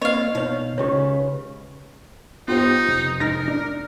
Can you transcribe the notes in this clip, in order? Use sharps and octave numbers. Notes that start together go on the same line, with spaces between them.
A#3 C4 C#5 D#5 F5
B2 D#4 C#5 F5
C#2 C#3 G4 B4 C#5
G2 B3 D#4 F4 G4 C5
F1
G#2 D#4 A#4 A#5 A#6
D4